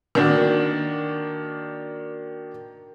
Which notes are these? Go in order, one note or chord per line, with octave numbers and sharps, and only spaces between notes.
D#3 A#3 D4 F#4